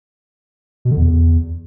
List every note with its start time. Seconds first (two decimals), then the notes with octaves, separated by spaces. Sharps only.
0.85 B2
0.91 D3
0.97 E2